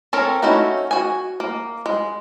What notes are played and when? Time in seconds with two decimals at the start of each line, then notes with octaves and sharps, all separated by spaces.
0.13 C4 C#4 A4 A#4 C#5
0.42 A3 C#4 D#4 E4 F#4
0.91 F#4 G#5
1.40 A#3
1.86 G#3